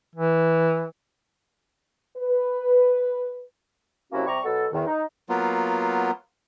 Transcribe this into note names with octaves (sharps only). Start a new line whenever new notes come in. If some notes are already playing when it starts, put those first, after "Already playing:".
E3
B4
C3 F#3 A#3 C#4 E4 F#4
C3 G3 G4 D5 A#5 C#6
B2 F#3 F#4 A4
E2 D#3
D#4
F#3 A#3 B3 F4